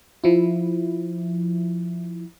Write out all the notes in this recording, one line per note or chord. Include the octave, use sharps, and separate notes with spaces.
F3 E4